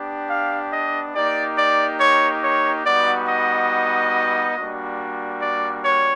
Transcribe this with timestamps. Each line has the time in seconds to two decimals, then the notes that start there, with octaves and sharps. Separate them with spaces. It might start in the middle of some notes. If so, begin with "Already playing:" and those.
Already playing: B3 D4 G4
0.30 F5
0.73 D#5
1.15 A#3 D#4 G4 D5
1.58 D5
2.00 C#5
2.44 C#5
2.85 G3 B3 D#4 F#4 D5
3.29 D#5
4.57 G3 A#3 D4 F#4
5.42 D5
5.85 C#5